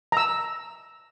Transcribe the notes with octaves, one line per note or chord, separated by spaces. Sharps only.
A#5 E6